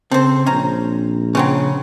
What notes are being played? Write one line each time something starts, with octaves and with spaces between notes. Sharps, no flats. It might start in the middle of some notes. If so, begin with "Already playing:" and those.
C#3 C4 A4 C5
A#1 C#4 A#5
C#3 F#3 C4 C#4